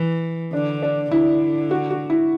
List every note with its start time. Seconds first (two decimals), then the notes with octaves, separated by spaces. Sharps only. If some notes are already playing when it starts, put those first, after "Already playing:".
Already playing: E3
0.53 D3 D4
0.83 D4
1.11 D3 E4
1.71 F#4
1.91 F#4
2.10 E4